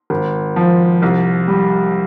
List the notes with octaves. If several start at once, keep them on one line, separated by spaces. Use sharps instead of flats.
G#1
F3
C2
G3